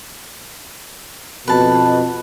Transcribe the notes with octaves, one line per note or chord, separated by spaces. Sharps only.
F2 B2 B4 A5